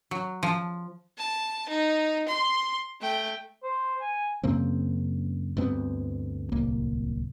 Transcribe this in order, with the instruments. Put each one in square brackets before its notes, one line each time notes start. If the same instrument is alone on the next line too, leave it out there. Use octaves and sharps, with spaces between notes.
[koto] F#3
F3
[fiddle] A5
D#4
C6
A3 G5
[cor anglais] C5
G#5
[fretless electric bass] F#2 C#3 A#3 C4
D2 G2 B3 C4
D1 C2 A#3